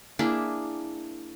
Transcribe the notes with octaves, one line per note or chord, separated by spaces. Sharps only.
A#3 D4 E4 G#4